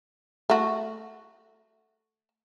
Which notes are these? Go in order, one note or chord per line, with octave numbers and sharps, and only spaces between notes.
A3 F#4